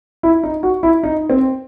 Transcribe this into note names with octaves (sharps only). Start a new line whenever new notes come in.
E4
D#4
F#4
E4
D#4
C4